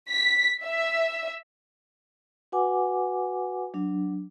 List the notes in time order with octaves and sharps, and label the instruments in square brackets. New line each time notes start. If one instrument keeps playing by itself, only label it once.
[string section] B6
E5
[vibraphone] F#4 B4 F#5 G#5 D6
F#3 D4